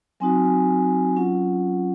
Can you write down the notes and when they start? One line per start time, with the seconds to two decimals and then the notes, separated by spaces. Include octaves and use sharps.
0.20 F#3 C4 D#4 F#4 G#5
0.45 G#5
1.16 F#3 C#4 F4 F#5